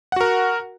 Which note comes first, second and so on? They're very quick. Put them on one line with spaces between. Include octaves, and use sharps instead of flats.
F#5 F#4 A#4